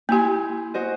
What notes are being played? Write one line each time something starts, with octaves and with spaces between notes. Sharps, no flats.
A#3 E4 G4 G#5 C6
F#4 C5 D#5